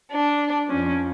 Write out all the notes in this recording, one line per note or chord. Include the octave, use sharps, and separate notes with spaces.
D4
F2 F3 C#4